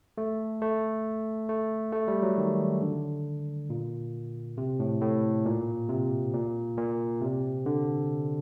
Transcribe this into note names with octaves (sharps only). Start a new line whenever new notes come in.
A3
A3
A3
A3
G3
F#3
D#3
D3
A#2
C3
A2
A2
A#2
C3
A#2
A#2
C3
D3